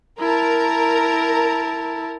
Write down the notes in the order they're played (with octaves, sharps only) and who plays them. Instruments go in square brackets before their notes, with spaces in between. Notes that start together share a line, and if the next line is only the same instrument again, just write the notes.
[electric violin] E4 A5 [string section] A#4